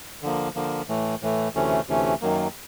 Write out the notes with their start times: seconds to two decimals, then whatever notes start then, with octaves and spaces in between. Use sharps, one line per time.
0.23 D3 F3 A#3
0.55 D3 F3 A#3
0.89 A2 E3 A3
1.22 A2 E3 A3
1.54 D2 C3 E3 A3 C#4
1.88 D2 C3 E3 A3 C#4
2.21 F#2 D#3 F#3 A#3